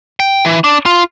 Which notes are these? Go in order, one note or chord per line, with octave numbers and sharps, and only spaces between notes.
G5
E3
D4
F4